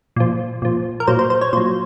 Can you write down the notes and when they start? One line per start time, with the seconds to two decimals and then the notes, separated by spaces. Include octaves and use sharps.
0.16 A#2 F3
0.62 A#2 F3
1.00 A#4
1.07 A#2 F#3 C5
1.19 C5
1.30 C5
1.41 C#5
1.53 A#2 F#3 C5